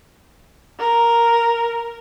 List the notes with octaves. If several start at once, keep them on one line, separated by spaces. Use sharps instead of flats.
A#4